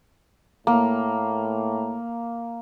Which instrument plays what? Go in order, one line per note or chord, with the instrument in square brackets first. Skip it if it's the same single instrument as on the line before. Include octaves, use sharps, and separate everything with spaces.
[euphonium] A2 [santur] A#3